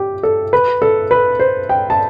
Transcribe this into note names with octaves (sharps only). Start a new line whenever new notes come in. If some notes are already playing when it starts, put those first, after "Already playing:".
Already playing: G4
A4
B4
A4
B4
C5
G5
A5